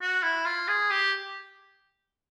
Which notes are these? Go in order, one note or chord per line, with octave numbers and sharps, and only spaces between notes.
F#4
E4
F4
G#4
G4